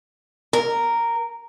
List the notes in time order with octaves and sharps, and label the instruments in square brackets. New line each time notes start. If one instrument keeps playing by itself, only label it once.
[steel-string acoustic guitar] A#4